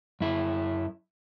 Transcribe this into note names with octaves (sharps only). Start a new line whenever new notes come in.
F#2 E4